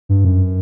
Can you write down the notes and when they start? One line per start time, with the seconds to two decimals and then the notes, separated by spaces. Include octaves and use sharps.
0.09 G2
0.25 F#2